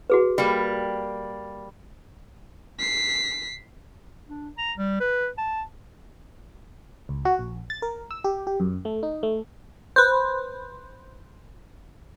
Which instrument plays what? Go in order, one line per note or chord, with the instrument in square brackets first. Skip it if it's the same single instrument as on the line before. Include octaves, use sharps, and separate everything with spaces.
[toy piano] F#4 G#4 B4
[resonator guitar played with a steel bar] G3 A#3
[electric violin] B6 C7
[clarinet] D4
A#5
G3
B4
A5
[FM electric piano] C#2
F#4
A#1
A6
A#4
E6
G4
G4
F#2
A3
D#4
A3
[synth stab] B4 C5